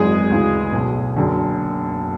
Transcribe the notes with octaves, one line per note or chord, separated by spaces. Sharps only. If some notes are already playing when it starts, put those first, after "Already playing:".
Already playing: G#1 F#2 E3 G#3 G#4
D2 C#3 E3
B1 B2
F#1 F#2 D3